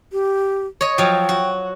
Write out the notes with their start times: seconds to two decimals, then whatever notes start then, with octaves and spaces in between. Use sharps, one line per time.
0.12 G4
0.81 C#5 D#5
0.98 F3 F#3 G5
1.29 F#4